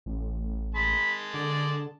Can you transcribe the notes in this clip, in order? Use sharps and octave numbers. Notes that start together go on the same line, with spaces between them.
A1
G#3 A5 B5
D3 D5